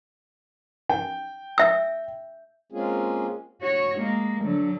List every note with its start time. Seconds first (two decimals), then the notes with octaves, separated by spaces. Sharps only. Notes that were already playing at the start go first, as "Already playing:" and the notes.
0.89 G5
1.58 E5 E6
2.72 G#3 A#3 C4 C#4 F4 G#4
3.62 F#4 C#5
3.99 G#3 A#3
4.44 D3 F#3